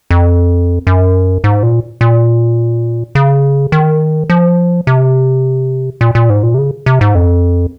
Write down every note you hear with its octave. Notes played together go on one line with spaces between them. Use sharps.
F2
F#2
G#2
A#2
A#2
C#3
D#3
F3
C3
A#2
A#2
G#2
A#2
C3
C#3
C3
G#2
F2